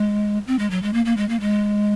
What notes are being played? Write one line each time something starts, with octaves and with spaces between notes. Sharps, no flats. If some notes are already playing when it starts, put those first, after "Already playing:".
Already playing: G#3
C4
G#3
F#3
G#3
A#3
A#3
G#3
A#3
G#3